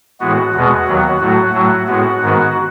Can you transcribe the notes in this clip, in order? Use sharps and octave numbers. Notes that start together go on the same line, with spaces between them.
A2 E3 G#3 B3 F#4
E2 B2 G#3 B3 F#4
D#2 D#3 F#3 B3
A2 F#3 A3 F#4
A2 F#3 A3
A2 G#3 B3 F#4
G#2 D#3 G#3 B3